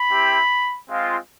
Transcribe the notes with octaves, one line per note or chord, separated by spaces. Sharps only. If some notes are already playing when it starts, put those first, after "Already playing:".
Already playing: B5
C4 E4 G4
G#3 C4 F4